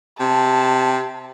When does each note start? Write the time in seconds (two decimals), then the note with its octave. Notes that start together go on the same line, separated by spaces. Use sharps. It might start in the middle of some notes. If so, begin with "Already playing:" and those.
0.20 C3 A5